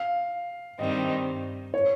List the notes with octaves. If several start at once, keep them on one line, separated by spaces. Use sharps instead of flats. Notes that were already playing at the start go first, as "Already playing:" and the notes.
Already playing: F5
G2 D#3 G3 C4 D#5
C#5